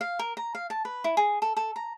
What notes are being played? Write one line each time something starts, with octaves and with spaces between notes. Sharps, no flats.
F5
A#4
A#5
F5
A5
B4
E4
G#4
A4
A4
A#5